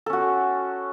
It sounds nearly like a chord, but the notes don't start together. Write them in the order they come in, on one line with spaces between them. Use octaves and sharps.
A4 C#4 F#4